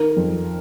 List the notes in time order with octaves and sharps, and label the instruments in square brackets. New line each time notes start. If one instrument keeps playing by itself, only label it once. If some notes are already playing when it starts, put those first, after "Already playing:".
Already playing: [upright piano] D#3 A#4
F2